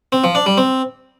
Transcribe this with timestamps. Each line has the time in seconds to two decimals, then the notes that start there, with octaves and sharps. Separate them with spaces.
0.12 C4
0.24 F3
0.35 D4
0.46 G3
0.58 C4